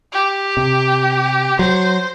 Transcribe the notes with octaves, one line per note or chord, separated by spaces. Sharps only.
G4
C3
F#3 C5